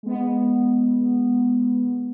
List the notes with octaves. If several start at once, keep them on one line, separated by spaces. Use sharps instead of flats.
G#3 B3